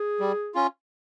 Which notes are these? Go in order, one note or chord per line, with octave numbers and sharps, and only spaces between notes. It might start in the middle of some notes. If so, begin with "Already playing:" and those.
Already playing: G#4
G3
C#4 F4